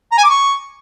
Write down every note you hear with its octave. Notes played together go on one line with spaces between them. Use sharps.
A#5
G#5
D6
C#6